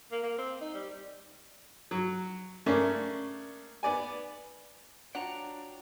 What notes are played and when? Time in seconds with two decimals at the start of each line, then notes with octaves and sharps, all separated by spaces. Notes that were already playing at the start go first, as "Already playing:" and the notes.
0.11 A#3
0.23 A#3
0.38 C4
0.61 D#4
0.74 G3
1.91 F#3
2.66 C#3 A3 A#3 C#4 D4
3.83 B3 D5 G#5
5.15 D4 F4 F#4 C#5 F#5 G5 A#5